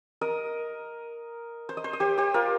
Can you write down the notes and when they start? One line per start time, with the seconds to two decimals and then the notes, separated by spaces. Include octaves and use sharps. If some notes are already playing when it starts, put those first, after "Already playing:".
0.21 A#4 D#5
1.69 C5
1.77 D#5
1.84 C5
1.93 D#5
2.00 G4 C5
2.18 G4 C5
2.34 F4 A#4